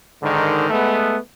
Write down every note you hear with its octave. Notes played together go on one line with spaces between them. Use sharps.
G#2 D3 D#3
G#3 A3 B3